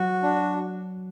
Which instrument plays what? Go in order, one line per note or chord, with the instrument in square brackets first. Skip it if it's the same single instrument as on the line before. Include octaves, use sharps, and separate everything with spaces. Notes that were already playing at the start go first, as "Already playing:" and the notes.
Already playing: [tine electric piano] F#3 [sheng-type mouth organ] F#4
[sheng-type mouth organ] D4